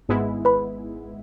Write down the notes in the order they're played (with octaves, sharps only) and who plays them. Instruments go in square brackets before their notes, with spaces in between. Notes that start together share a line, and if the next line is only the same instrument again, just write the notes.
[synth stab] G#1 G#2 G#3 B3 E4
[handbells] B4 B5